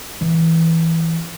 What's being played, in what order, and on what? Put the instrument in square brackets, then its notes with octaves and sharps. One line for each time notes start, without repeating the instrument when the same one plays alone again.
[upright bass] E3